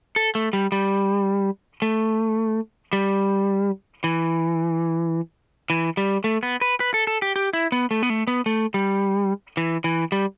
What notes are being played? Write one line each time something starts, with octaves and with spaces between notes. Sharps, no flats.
A4
A3
G3
G3
A3
G3
E3
E3
G3
A3
B3
B4
B4
A4
A4
G4
G4
E4
B3
A3
B3
A3
B3
A3
G3
E3
E3
G3